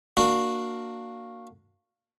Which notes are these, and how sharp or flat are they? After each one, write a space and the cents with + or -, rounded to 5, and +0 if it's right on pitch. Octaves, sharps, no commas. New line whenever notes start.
A#3 +0 D4 +15 F#4 -15